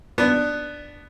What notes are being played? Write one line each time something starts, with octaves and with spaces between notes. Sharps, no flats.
B3 D4